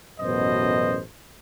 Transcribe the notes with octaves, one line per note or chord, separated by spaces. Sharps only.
A1 F#2 B2 C5 D#5